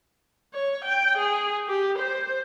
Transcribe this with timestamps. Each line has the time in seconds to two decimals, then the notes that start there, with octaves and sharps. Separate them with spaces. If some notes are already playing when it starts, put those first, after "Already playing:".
0.54 C#5
0.85 G5
1.18 G#4
1.68 G4
1.99 C5